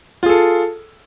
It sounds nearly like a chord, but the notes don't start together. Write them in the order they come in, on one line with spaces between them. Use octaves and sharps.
F4 G#4 A4